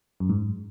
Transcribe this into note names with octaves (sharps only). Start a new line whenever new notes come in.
F#2
G#2